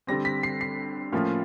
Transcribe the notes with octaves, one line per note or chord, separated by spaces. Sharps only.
D3 G3 C4 A#6
B6
C7
C7
A2 F3 A#3 C#4 F4